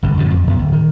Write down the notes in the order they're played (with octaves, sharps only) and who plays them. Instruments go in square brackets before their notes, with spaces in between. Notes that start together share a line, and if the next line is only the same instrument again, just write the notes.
[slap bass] G1 C2 G#2
F#2 A2 D3 F3
F2
A1 F#2 B3
D1
D#3